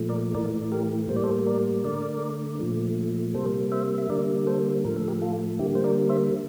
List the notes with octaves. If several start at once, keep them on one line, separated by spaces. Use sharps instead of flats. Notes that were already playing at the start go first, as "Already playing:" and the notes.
Already playing: A#2 F3 A3
A#4 D5
A2 E3 A3 A#4 D5
G4 A#4
A2 G3 A#3 C5
D5
A4 C5
A#4 D5
D3 A3 A#4 D5
A#2 F3 A3
C3 G3 A#3 A4 C5
C5 E5
E5
D3 G3 A#3 A#4 D5
A4 C5
A2 F3 A3 A#4
A4
G4 A#4
F4 A4
D3 G3 A#3 E4 G4
C5
A#4 D5
C5 E5